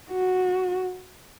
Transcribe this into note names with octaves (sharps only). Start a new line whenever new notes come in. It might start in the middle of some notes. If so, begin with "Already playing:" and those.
F#4